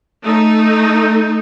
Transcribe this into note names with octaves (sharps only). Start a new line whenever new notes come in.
A3 D#4